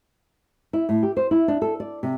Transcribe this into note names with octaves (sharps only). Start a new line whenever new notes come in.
E4
A2
G4
C5
E4
D4
A4
D5
C3